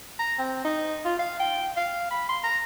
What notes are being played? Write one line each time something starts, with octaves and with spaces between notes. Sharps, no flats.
A#5
C4
D#4
F4
F5
G5
F5
B5
C6
A#5